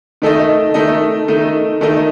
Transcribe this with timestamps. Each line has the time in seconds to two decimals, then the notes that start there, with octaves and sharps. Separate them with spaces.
0.22 D#3 A3 D#4 A4 D#5
0.74 D#3 A3 D#4 A4 D#5
1.28 D#3 A3 D#4 A4 D#5
1.81 D#3 A3 D#4 A4 D#5